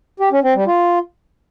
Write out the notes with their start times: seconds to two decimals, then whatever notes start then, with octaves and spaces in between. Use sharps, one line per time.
0.20 G4
0.32 C#4
0.43 C4
0.55 G3
0.67 F4